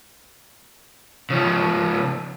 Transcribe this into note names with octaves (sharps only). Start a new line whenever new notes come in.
C#3 F3